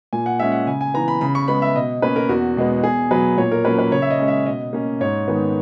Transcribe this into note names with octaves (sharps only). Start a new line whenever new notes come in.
A#2 G#5
F#5
G#3 C#4 E5
F#5
C#3 G#5
G#5
E3 B3 A#5
B5
C#3 B5
C#6
G#3 B3 B5
E5
B2 D#5
A#3 C#4 B4
A#4
E2 F#4
B2 G#3 B3
E2 G#4
B2 F#3 B4
A#2 C#5
A#4
F#3 A#3 C#4 B4
B4
C#3 C#5
E5
D#5
G#3 C#4
E5
B2 D#5
A#3 C#4
G#2 C#5
D#3 G#3 B3